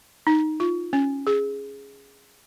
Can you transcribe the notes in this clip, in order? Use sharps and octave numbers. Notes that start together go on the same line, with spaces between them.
D#4
F4
C#4
G#4